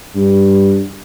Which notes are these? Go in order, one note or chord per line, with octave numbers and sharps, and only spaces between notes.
G2